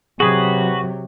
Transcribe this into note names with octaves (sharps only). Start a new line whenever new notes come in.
C3 F#3 F#4 G#4 B4